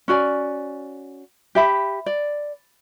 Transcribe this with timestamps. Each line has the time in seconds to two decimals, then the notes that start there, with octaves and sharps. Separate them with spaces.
0.08 C#4 F#4 D5 G#5
1.55 G4 E5 B5
2.06 D5